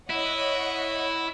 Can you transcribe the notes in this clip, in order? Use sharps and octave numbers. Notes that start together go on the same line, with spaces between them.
E4 C#5 D#5 F#5